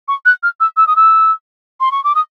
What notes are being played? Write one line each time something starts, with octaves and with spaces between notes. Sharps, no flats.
C#6
F#6
F6
E6
E6
D#6
E6
C6
C#6
D6
D#6